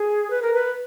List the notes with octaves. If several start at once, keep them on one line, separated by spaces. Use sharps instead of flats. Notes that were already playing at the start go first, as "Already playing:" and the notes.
Already playing: G#4
B4
A#4
B4